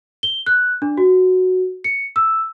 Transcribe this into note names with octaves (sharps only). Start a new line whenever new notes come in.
G7
F#6
D4
F#4
C#7
E6